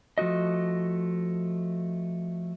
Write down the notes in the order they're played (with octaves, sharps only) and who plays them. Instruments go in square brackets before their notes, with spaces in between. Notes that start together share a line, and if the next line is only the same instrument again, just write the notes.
[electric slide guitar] F3 A3 F#4 D#5